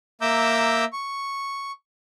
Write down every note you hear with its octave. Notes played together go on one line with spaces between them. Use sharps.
A#3 E5 A#5 D6 E6 G6
C#6